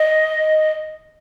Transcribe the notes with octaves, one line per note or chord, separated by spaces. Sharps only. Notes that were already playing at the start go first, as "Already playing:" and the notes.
Already playing: D#5